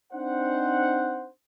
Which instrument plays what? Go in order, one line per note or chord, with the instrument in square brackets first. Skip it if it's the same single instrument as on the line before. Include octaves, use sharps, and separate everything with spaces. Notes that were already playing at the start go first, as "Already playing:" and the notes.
[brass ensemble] C4 D4 D#4 C5 F#5